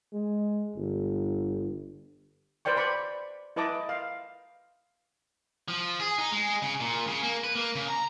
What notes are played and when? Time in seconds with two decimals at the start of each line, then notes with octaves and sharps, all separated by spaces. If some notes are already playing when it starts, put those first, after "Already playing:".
0.13 G#3
0.76 G1
2.65 B4 C5 D5 G5 C#6
2.77 D5 B5 C#6
3.56 E4 B4 D#5 A5 D6
3.89 F5
5.68 F3
6.00 G#4
6.18 D#4
6.32 G#3
6.62 C#3
6.80 A#2
7.07 C#3
7.23 A#3
7.44 B4
7.55 A#3
7.75 C#3
7.88 A#5